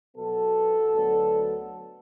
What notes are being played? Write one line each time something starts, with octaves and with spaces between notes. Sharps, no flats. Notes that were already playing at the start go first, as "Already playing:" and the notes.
B2 F#3 B3 A4
D2 D3 F#3 B3